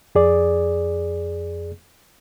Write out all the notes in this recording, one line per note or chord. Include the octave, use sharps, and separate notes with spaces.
F2 G#4 D5